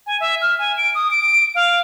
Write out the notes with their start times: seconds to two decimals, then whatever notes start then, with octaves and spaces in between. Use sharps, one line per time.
0.07 G#5
0.20 E5
0.42 F6
0.59 G#5
0.77 D7
0.95 D#6
1.11 D7
1.55 F5